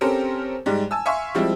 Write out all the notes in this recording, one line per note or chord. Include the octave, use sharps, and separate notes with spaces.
C4 C#4 G4 A4 A#4 C5
G#2 G3 G#3 D5
G#5 A5 E6
E5 F5 G#5 C6 C#6 E6
F3 G3 G#3 C4 E4